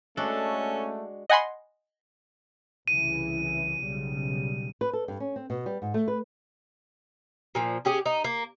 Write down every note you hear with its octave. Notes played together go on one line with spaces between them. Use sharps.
G#3 A3 C#4 D4 F#4 A4
D#5 F#5 G#5 B5 C6
C2 C#3 E3 D#7
B1 C#3 G3
B4
A4
G2
C#4
C4
B2
G3
G#2
A3
B4
A#2 F3
C#4 G4 G#4
D#4
A#3